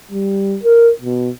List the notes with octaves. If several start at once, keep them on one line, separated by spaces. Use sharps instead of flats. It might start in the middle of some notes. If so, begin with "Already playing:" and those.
G3
A#4
B2